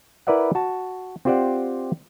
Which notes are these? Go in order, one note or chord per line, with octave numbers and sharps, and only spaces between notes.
E4 A#4 B4 D5 E5 F#5
F#4 A5
C4 F4 G4 C5 D5 F#5